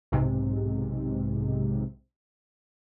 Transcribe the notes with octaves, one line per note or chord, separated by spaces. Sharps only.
B1 G#2 C3